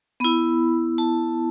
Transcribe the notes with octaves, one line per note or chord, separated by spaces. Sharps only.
B3 E4 B5
A5